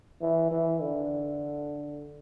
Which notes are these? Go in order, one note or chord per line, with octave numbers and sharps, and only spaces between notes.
E3
E3
D3